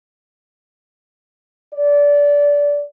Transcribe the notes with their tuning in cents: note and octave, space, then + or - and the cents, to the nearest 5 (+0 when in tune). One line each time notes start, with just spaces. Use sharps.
D5 -20